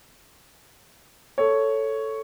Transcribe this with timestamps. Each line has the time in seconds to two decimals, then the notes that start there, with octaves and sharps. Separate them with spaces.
1.38 A4 C#5